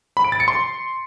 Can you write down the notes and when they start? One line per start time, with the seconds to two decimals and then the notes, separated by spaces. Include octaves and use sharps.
0.17 B5
0.24 D7
0.32 A6
0.40 C#7
0.48 C6